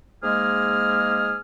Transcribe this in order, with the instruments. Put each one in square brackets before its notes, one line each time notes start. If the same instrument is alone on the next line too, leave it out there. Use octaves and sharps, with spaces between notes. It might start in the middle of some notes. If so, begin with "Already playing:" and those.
[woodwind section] G#2 G#3 A#3 G#4 F6